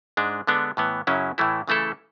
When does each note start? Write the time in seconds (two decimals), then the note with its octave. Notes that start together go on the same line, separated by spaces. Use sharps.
0.17 G#2 G#3 D4
0.47 D3 G#3 B3 D4
0.77 A2 E3 B3
1.07 F#2 C#3 F#3 C#4 E4
1.38 A2 E3 A3 E4
1.67 C#3 E3 A3 E4 A4